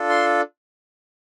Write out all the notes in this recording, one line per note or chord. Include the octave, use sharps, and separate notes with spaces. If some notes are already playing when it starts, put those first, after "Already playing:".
Already playing: D4 F4 A4
C6